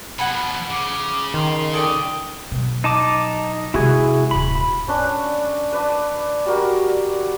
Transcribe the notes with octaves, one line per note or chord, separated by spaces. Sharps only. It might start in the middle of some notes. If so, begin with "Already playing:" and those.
B2 F3 F#5 G#5 B5
C#3 D6
D#3 C6
A4 D5 G5 D#6
B2 F#3
D#4 A5 D6
C3 G#3 E4 F#4 G#4
D#1 G#2 B5
C#4 D4 B4
B4 D5 A5
G3 F#4 A#4